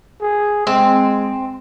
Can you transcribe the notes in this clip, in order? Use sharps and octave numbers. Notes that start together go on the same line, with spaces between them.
G#4
G#3 C4